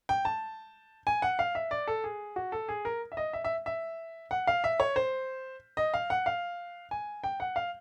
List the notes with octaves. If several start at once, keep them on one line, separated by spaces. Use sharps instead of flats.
G5
A5
G#5
F#5
F5
E5
D5
A4
G#4
F#4
A4
G#4
A#4
E5
D#5
E5
E5
E5
F#5
F5
E5
C#5
C5
D#5
F5
F#5
F5
G#5
G5
F#5
F5